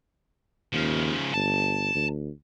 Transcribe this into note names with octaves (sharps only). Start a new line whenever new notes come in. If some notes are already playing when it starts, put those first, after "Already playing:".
D#2 C#3 F3
G1 A5
D2